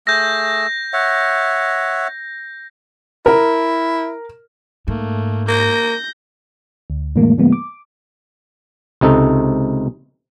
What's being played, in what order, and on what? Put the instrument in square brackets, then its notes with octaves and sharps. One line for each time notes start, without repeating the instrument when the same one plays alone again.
[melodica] A3 G#4 E6 [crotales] G6 A#6
[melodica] C#5 E5 F#5
[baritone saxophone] E4 [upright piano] A#4
[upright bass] G#2 [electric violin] A3 A#3
[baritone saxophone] A#3 [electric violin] G6 A#6
[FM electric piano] D2
F2 A2 D3 E3 G#3 A#3
A2 D3 F3 G#3 A#3 B3
D6
[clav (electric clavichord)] C#2 C3 D#4 A4